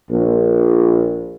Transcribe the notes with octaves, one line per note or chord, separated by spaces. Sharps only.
A#1